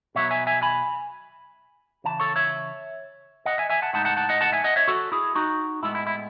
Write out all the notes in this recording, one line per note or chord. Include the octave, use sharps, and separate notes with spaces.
B2 F#3 B3 C#5 E5
E5 G#5
E5 G#5
G#5 B5
C#3 E3 A5
A4 C#5
C#5 E5
D#5 F#5
E5 G#5
E5 G#5
F#5 A5
A2 G#3 D#4 F#5 A5
F#5 A5
F#5 A5
D#5 F#5
F#5 A5
E5 G#5
D#5 F#5
C#5 E5
F#4 A4
E4 G#4
D#4 F#4
A2 G#3 B3 E4
E4
E4